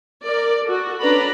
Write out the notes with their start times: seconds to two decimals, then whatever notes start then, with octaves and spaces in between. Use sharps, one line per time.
0.24 A#4 D5
0.65 F#4 A4
1.00 C#4 D4 B4 D5 A#5 B5